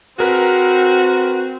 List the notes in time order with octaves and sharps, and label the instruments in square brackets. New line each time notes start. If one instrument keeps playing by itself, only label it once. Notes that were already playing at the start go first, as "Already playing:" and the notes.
[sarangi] C4 [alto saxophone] F#4 [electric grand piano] G#4 A#4 B4